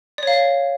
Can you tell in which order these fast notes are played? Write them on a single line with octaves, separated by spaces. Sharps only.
D5 C#5 F5